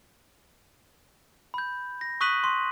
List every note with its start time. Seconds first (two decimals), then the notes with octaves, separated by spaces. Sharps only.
1.54 B5 G6
2.01 A#6
2.21 C#6 D#6 F#6 B6 D#7 F#7
2.44 C6